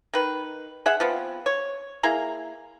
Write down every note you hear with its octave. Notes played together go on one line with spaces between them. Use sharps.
D#3 B4
G#4 E5 F#5
F3 B3 C4
C#5
A#3 E4 G#4 A#5